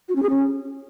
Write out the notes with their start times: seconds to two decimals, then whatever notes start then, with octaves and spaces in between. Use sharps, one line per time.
0.09 F#4
0.15 C#4
0.22 G#4
0.29 C#4